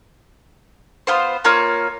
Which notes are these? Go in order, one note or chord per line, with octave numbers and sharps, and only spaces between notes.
B3 F4 C5
A#3 F4 C#5 F6